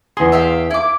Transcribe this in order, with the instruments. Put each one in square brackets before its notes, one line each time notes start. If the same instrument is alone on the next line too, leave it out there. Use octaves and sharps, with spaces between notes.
[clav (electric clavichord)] E2 G#4 [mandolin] C6
[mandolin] E5 F5 G5
E4 D6